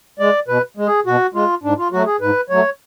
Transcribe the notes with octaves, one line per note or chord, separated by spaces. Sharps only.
G#3 D5
B2 B4
G#3
G#4
B2 F#4
G#3 F4
G#2 D4
F4
F#3 A3 F#4
G#4
G#2 B4
F#3 A3 C#5